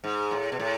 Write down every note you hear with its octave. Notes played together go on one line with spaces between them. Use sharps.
G#2
A2
B2
A2